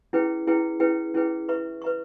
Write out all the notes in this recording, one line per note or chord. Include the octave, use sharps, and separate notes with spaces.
C#4 E4 G#4 B4 G5
C#4 E4 G#4 B4 G5
C#4 E4 G#4 B4 G5
C#4 E4 G#4 B4 G5
B4 E5 A#5 C#6
B4 E5 A#5 C#6